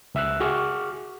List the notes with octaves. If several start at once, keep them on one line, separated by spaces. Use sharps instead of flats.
C#2 E5 E6 F#6
F#4 G#4 C#6 D6 F6